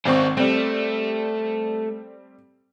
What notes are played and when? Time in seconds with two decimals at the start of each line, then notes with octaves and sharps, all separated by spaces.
0.05 G#1 C4 C5 D5 F5 C#6
0.37 G3 A3 C4